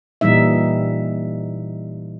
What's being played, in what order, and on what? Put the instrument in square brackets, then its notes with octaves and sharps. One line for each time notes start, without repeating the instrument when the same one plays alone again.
[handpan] A#2 E3 G3 D#4 E5